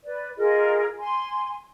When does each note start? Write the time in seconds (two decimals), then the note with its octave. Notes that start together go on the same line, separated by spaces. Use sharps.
0.04 B4 D5
0.36 F4 G#4 A#4 D#5
0.99 G#5 C6